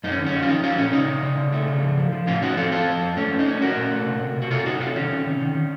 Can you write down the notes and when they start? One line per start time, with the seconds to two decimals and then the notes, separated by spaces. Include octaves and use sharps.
0.04 F#2 D#4
0.11 C#4
0.19 D#3
0.26 C#4
0.33 D#3
0.42 F4
0.48 F3 D#4
0.63 F3 C#4 F4
0.78 A#2 C#4
0.93 C#3 D#4
1.08 C#3
1.23 C#3
1.38 C#3
1.53 A3
1.68 C#3
1.83 F3
1.97 F3
2.12 F3
2.27 A2 C#4 F4
2.42 F3 D#4 F#4
2.57 C4 F4 A4
2.72 F3 F4 A4
2.87 F3
3.02 F2
3.17 A3 C#4
3.32 A3
3.39 D#4
3.46 C#4
3.61 C#4 F#4 A#4
3.76 A#2
3.91 A3
4.06 C3
4.21 C3
4.36 C3
4.42 F#4
4.50 C3 F4 A4
4.65 C3 D#4 F#4
4.81 C3 F4 A4
4.96 D#3 C#4
5.11 D#3
5.26 C3
5.41 D#3
5.55 D#3